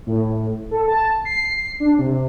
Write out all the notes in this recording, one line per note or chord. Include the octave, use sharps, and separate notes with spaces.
A2
A4
A5
C7
D4
C3